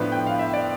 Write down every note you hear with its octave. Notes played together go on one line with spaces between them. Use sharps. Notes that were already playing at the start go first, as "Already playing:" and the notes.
Already playing: A2 F3 B3 D4 B4
G5
F5
E5
D5